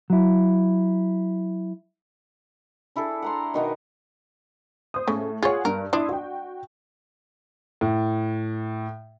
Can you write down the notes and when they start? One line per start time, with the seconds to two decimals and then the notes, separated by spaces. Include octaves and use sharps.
0.10 F#3 E4
2.96 D4 E4 G#4 A4
3.22 F#5 A#5 C6
3.54 B2 D#3 B3 A#4
4.94 C5 D#6
5.08 A2 C#3
5.43 F4 G#4 C#5 F#5
5.65 G2 A#4
5.93 D4 E4 C6 D#6
6.09 F#4 G5
7.81 A2